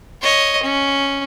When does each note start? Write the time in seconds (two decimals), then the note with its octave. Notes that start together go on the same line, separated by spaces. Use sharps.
0.22 C#5 D#5
0.63 C#4